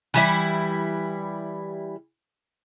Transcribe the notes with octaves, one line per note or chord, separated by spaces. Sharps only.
E3 G3 E4